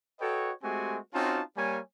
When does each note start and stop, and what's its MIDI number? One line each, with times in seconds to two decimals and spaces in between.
0.20 0.52 66
0.20 0.52 69
0.20 0.52 71
0.20 0.52 73
0.20 0.52 75
0.20 0.52 79
0.63 0.99 56
0.63 0.99 57
0.63 0.99 60
0.63 0.99 66
0.63 0.99 67
0.63 0.99 80
1.14 1.42 60
1.14 1.42 61
1.14 1.42 63
1.14 1.42 65
1.14 1.42 66
1.14 1.42 81
1.57 1.80 55
1.57 1.80 58
1.57 1.80 73
1.57 1.80 80